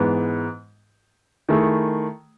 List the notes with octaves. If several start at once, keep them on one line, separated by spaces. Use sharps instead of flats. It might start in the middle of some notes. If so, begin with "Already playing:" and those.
Already playing: G#2 E3 B3
D#3 A3 E4 G#4